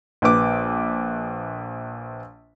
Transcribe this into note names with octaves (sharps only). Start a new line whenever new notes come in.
A#1 B4 D6